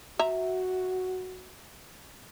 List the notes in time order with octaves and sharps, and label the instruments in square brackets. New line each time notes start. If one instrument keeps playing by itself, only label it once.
[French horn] F#4 [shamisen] E5 A#5